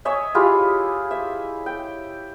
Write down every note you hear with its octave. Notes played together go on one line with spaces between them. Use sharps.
C#5 D#5 E5 G#5
E4 F4 G4 G#4
E5
G5